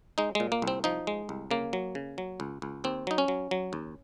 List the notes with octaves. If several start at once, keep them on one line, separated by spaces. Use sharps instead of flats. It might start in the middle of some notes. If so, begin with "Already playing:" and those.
G#3 D#4
A#2 G#3
A#3
C2
C4
F3 D#4
G#3
C2
C#3 A#3
F#3
C#3
F#3
C#2
C#2
D#2 C4
F#3 D#4
C#4
F#3
F#3
D#2